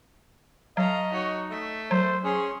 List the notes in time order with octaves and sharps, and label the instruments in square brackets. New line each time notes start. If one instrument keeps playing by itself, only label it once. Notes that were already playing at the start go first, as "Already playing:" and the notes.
[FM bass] F#3 [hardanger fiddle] A3 A#5 [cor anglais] D#5 [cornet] F5
[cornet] D#4 [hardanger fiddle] F#4 C#5
[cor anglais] A3 [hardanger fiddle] E5
[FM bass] F#3 [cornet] C5
[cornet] C#4 [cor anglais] G#4 [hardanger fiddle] C#5 C6